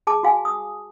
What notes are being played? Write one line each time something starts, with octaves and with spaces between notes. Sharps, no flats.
G#4 A5 D6
F#4 F5 G#5
D#6